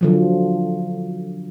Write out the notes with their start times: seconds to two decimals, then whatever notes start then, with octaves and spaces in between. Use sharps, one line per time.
0.01 D3 F3 F#3